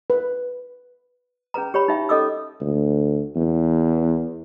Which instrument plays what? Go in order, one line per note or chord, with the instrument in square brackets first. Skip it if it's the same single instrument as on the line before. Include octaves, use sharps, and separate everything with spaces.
[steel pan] B4
[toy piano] C#4 G#4 B4 A#5
G4 C#5 B5
D#4 E5 G5
C#4 A4 D#5 D6 E6
[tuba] D2
E2